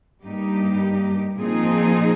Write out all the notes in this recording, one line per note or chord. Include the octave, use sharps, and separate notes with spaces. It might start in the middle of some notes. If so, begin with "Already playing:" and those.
G2 G3 A#3 D#4 G4
A#2 F3 C4 D#4 G#4